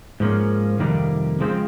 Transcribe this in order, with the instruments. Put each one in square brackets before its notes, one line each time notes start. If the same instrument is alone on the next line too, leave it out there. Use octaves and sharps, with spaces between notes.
[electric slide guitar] G#2 F3 A#3 C#4
F2 C3 D#3 G3 A#3
C#3 F3 G#3 C4